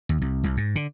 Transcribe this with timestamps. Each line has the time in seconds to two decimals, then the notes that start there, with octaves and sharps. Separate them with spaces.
0.09 D#2
0.21 C2
0.44 C2
0.57 G#2
0.76 D3